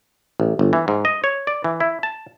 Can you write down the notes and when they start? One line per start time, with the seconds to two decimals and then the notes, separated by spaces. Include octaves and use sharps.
0.40 A1
0.59 G1
0.73 E3
0.88 G#2
1.05 D#5
1.24 C#5
1.47 D5
1.64 E3
1.80 E4
2.03 A5